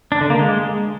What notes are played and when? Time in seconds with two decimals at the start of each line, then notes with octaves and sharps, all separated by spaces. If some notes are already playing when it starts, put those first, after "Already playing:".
0.12 D4
0.21 D3
0.30 A#3
0.39 G#3